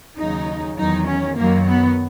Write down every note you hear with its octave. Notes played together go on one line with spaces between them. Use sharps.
D#2 C#3 F#3 D#4
E2 D#3 F#3 D#4
C#4
F#2 D#3 F#3 A#3
B3